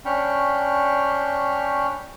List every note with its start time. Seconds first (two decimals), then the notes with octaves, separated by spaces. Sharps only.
0.05 C#4 D4 G5 B5 C#6 F6